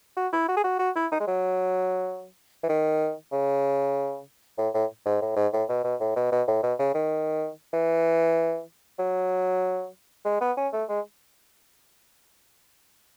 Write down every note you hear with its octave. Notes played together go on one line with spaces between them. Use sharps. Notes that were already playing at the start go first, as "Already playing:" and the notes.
F#4
E4
F#4
G#4
F#4
F#4
E4
D#4
G#3
F#3
E3
D#3
C#3
A2
A2
G#2
A2
G#2
A2
B2
B2
A2
B2
B2
A2
B2
C#3
D#3
E3
F#3
G#3
B3
C#4
A3
G#3